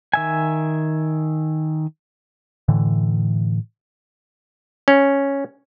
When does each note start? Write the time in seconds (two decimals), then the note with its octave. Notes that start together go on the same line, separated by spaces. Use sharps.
0.14 D#3 E5 G#5
2.68 A2 D3 E3
4.88 C#4